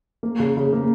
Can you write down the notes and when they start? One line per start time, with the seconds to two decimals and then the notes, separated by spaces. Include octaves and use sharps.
0.23 A#3
0.39 C#3
0.57 C#3
0.73 A#3